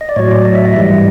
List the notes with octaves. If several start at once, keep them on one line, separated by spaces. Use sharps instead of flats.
D#5
D5
A2 F#3 C#5
D5
D#5
E5
D#5
E5
G#2 E3 G3 D#5